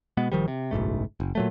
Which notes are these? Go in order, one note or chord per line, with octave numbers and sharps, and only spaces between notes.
B2 G#3 B3
A1 D#3 F3 G3
C3
F#1 B1 G#2 A3
F#1
A#2 F#3 A3